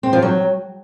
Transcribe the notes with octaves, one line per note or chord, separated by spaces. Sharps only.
C4
F3
F#3